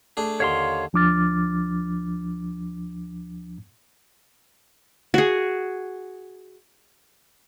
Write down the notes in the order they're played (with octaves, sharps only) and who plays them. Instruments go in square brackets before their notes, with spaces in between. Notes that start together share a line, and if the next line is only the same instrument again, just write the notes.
[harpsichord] A3 D4 G#4
[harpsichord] D#2 D3 [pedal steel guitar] C#5 F5 C6
[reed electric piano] D2 F3 D4 D6 F6 A6
[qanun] F#4 G#4